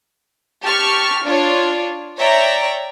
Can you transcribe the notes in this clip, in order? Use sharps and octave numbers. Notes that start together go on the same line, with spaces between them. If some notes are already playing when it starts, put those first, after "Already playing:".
G4 A5 C#6 F6
D4 F4 C#5
C#5 D5 E5 G5 A#5